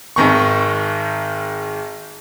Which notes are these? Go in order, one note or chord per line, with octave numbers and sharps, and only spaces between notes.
G#1 G#2 D#3 C#6